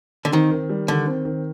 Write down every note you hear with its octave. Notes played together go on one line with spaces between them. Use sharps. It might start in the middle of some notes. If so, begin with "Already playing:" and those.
D3
D#3 C4
D#3
G3
D3 D#3
C4
D#3